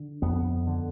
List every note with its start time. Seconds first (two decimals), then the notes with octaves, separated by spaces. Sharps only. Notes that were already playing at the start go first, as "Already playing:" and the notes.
Already playing: D3
0.22 F2 B3
0.67 D3